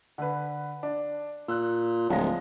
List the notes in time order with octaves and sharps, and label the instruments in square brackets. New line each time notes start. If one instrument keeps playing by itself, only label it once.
[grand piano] D3 B4
D4
[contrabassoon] A#2 [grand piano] E6 F#6
[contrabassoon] D1 [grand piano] F3 G#3 A#6